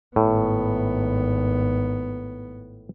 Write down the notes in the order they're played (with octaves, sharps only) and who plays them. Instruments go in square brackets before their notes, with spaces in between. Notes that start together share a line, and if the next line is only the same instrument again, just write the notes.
[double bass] G#1 B3 [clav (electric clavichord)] A2